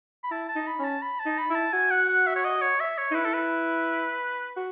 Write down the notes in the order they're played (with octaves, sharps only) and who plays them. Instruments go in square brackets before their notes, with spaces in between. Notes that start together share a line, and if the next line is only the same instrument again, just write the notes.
[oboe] B5
[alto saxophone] E4 [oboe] A5
[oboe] A5
[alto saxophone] D#4
[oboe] B5
[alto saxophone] C#4 [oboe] A5
[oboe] B5
A5
[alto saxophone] D#4
[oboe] B5
[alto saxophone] E4
[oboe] A5
[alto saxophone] F#4 [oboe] G#5
[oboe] F#5
F#5
E5
C#5
D#5
C#5
E5
C#5
[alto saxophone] D#4
[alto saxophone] E4 [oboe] B4
[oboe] A4
B4
[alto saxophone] F#4